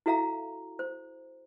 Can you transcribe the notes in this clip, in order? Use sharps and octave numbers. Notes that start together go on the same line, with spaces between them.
E4 F#4 A4 E5 F5 A#5
C5